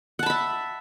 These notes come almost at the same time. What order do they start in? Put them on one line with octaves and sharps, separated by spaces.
F#5 A5 B5 E5